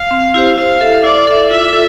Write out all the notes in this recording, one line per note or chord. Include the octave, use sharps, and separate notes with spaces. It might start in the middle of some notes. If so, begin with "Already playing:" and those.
Already playing: F5
C4
E4 G4 C5
E4 F5
A4 E5
E4 D5
A4 E5
F4 E5
A4